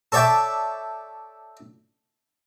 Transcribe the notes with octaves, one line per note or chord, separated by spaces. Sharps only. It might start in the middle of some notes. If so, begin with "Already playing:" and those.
A4 C#5 D5 E5 G5